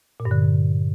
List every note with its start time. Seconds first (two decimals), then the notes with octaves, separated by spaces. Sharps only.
0.20 A#2
0.25 G2
0.31 D3